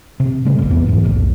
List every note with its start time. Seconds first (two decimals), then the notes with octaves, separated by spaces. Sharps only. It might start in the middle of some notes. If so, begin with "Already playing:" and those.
0.20 C3
0.45 C#3 G3 A3 C4
0.58 G#1 G2
0.70 E2 B3
0.86 E2 G#2 D#3 E3
1.03 F1 B1 A2